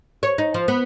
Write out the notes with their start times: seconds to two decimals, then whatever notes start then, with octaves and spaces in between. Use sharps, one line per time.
0.23 C#5
0.38 D#4
0.54 F3
0.68 B3